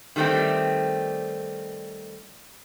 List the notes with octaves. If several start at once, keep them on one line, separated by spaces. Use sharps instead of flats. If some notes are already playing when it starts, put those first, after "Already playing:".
D#3 G3 A3 A#3 C4